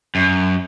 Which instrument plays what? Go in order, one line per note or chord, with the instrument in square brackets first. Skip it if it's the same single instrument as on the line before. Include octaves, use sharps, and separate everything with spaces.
[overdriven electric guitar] F#2